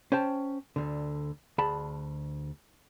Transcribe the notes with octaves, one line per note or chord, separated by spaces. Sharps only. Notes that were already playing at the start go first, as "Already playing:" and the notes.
C#4 C5 G5 A5
D2 D3
D2 G#4 A5 B5